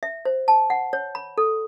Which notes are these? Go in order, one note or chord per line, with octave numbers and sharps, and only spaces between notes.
E5
C5
A5
F#5
C#5
B5
A4